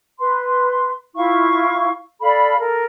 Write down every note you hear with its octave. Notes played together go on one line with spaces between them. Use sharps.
B4 C6
E4 F4 F5 C#6
A4 D5 F5 B5
A4 A#4